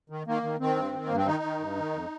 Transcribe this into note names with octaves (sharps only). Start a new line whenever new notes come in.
D#3
D#3 A#3
D#3
D#3 C4
G2
D#3
G2 A#3
C4
D#3 D#4
D#3
G2
D#3
F2